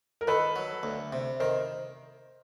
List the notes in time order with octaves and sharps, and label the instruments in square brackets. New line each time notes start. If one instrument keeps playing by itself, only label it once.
[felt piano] A#4
[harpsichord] D#3 [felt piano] A4 B4
[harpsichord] F#3
D2
C3
[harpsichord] D#3 [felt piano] A#4 C5